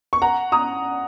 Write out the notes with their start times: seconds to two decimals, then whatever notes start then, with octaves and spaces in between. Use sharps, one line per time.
0.13 C#6
0.22 F#5 A#5
0.52 A#5 D#6